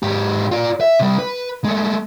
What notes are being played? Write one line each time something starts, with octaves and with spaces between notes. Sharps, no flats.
G#2 G4
F4 D5
E5
C3 G3
B4
G#3 A3